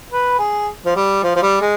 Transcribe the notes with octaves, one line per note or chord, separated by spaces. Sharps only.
B4
G#4
F3
G3
F3
F3
G3
G#3